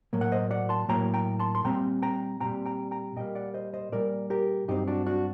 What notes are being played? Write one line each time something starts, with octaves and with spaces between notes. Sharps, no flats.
A2 F#3 A#3
F#5
C5 D#5
D5 F#5
A5 C6
A2 F#3 A#3 G5 A#5
G5 A#5
A5 C6
C6
A#2 G3 C4 G5 A#5
G5 A#5
A#2 G3 C4 G5 A#5
G5 A#5
G5 A#5
A#2 G3 A#3 D#5 G5
D5 F#5
C5 D#5
C5 D#5
A#2 G3 A#3 A#4 D5
G4 A#4
G2 F#3 C4 D#4 G4
D4 F#4
D4 F#4